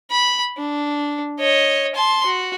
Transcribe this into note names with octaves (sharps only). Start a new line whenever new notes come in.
B5
D4
C#5 D#5
A5 C6
F#4